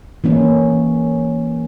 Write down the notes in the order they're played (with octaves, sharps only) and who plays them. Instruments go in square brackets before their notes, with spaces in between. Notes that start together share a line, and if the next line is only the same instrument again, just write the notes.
[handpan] E3 A#3 C#4